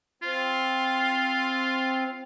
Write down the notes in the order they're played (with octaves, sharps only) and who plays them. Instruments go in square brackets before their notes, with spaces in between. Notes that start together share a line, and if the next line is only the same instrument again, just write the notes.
[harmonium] C4 [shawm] F4